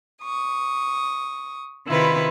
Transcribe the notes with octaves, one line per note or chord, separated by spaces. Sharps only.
C#6 D#6
C3 D#3 E4 F4 B4